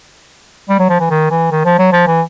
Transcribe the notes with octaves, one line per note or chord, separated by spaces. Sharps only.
G3
F#3
F3
E3
D#3
E3
D#3
F3
F#3
F3
E3